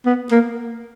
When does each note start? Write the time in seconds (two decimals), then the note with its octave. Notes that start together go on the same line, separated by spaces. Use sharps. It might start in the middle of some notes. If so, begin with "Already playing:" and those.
0.06 B3
0.31 A#3